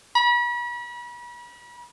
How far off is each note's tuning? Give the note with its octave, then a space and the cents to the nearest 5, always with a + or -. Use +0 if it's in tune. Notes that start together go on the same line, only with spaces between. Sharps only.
B5 -40